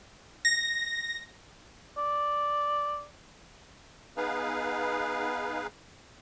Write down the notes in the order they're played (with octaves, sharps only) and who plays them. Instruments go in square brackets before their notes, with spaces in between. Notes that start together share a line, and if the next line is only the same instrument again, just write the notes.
[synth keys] A#6
[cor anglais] D5
[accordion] B3 D#4 G#4 B4 F5